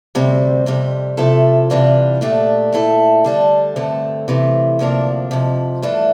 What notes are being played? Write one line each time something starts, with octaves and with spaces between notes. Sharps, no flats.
D2 C3 G3 C4
F2 C3 G3
C3 F3 A3 E4 A4
C3 E3 G3 D4 F4
A#2 A3 D4 G4
A#2 A3 E4 A4
D3 G3 D4 A4
G2 D3 A3 C4
C3 E3 A3
D2 C3 F3 A#3 D4
F2 C3 F3
G2 E3 A3 D4